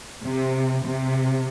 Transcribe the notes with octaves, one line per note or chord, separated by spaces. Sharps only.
C3
C3